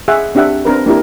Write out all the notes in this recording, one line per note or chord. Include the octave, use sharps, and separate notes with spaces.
G#4 E5 F#5
C4 D4 G4 E5 F#5
C4 D4 A#4 B4
A#3 D4 E4 G4 A#4